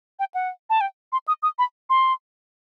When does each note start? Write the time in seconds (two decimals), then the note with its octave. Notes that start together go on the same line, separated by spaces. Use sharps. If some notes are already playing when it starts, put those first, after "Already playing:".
0.19 G5
0.34 F#5
0.70 A5
0.81 G5
1.12 C6
1.28 D#6
1.43 D#6
1.59 B5
1.90 C6